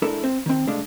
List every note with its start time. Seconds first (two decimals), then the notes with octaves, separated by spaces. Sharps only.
0.02 G#3 D4 E4 A4 A#4 E5
0.23 C4 C5
0.46 D#3 C4
0.67 C2 G#3 A3 D4 F5